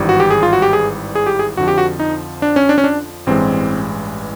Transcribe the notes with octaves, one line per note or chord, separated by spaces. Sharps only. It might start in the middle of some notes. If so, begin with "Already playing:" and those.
Already playing: G#1 G2 E3 G3
F#4
G4
G#4
F4
F#4
G4
G#4
G#4
G4
G#4
F2 D3 F3 F#4
G4
F#4
D#4
D4
C#4
D4
C#4
D4
A1 G2 E3 G#3 C4